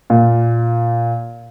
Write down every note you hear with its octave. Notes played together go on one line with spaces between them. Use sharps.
A#2